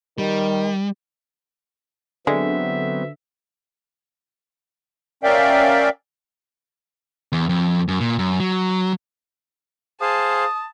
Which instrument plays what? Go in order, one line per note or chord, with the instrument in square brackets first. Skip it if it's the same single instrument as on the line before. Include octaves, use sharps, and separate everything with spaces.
[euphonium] D#3 [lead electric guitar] G3
[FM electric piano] D3 [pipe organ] F#3 B3 C4 [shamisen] G#3 [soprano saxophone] E5
[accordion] C#4 A#4 D5 E5 F5 G5
[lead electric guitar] E2
F2
F#2
A#2
F#2
F#3
[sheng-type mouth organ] G#4 C5 F5 [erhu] A5 [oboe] D#6